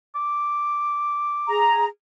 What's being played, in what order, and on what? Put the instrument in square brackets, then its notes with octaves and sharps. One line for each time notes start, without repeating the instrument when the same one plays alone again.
[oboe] D6
[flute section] G#4 A#5